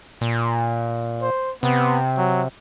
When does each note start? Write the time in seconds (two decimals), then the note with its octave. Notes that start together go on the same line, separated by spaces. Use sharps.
0.21 A#2
1.22 C5
1.63 C3 B3
2.17 F#3